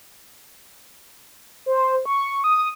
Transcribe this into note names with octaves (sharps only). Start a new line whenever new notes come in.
C5
C#6
D#6